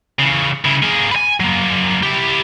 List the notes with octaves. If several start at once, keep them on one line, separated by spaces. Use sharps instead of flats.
C#3 E3
C#3 E4
A#3 G#4
B4 G#5
F#3 A#3
E4 G4